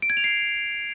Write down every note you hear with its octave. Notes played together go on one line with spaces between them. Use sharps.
D7
G#6
F7
C7